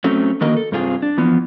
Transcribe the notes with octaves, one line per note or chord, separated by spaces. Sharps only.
F#3 A3 C4 C#4
D3 D#3 A#3 F#4 A#4 D#5
A4
G2 C3 C4 F4 G#4
D4
E3 F3 B3